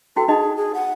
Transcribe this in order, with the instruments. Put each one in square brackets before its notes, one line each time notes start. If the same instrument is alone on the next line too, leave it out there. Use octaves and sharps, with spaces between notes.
[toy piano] E4 F#4 G5 [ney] A4
[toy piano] D#4 D#5 [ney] G#4
[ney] G#4
F#5